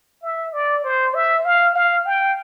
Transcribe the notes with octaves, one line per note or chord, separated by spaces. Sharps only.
E5
D5
C5
E5
F5
F5
G5